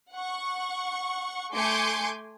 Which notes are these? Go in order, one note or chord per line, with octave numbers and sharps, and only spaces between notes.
F#5 C#6
A3 G#5 C6 D6 G6 C#7